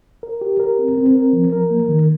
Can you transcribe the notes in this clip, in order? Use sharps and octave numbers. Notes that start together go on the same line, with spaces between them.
A#4
G4
A#4
C4
C4
A#4
F3
A#4
A#3
D#3